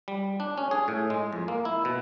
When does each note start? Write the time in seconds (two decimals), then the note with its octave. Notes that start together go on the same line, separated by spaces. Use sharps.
0.08 G3
0.40 D4
0.58 C#4
0.71 G#4
0.88 A2
1.10 G#3
1.33 F2
1.48 A#3
1.65 E4
1.85 B2